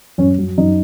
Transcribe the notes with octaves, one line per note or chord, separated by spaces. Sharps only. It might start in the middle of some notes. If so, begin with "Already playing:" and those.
F#2 C#4
F#3
F#2 D#4